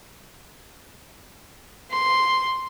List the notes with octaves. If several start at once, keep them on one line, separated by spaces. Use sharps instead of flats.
C6